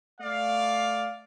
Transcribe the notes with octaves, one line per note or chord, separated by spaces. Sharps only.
A3 D5 F5